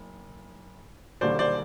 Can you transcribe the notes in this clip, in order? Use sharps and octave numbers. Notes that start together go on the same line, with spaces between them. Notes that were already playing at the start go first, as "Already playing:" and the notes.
Already playing: F#1
E1 D#2 D3 G3 C5 D5
C5 D5